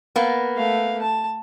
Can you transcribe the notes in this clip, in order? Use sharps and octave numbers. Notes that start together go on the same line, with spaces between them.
A#3 B3
A3 F5
A5